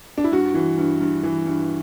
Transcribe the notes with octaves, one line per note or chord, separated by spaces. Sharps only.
D4
E4
G2 F#4
E3
G2
G2
E3
G2